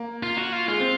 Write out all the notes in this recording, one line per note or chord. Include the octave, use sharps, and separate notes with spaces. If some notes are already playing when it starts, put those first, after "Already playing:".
Already playing: A#3
F4
F#4
F4
G#3 F4
C4